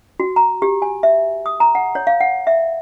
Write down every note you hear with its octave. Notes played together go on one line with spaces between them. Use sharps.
F#4
A#5
G4
G#5
E5
D#6
A#5
F#5
C#5
F5
F#5
E5